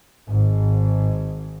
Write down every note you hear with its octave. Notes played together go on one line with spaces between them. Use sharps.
G#1 G#2